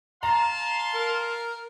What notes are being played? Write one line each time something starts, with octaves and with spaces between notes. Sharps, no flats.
F5 A5 A#5 C6
A#4